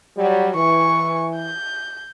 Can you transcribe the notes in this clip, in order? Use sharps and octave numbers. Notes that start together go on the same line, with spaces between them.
F#3 G3
E3 C#6
G6